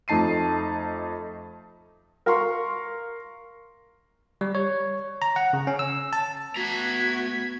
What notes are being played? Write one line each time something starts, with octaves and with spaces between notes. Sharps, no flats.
F2 A3 D#4 A5 C7 D#7
A#4 F5 A#5 C6 C#6
G3
C#5
A#5
F#5
C#3
C#4
E6
A5
A3 B3 F#4 A#5 G#6 B6